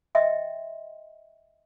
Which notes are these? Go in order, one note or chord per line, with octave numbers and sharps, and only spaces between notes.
D#5 E5 G5 C6